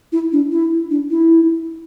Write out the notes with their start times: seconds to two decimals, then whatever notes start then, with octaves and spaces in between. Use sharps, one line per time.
0.12 E4
0.32 D4
0.52 E4
0.91 D4
1.10 E4